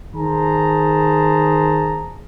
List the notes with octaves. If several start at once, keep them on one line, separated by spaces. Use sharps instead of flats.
D#3 G#4 C5 A5 A#5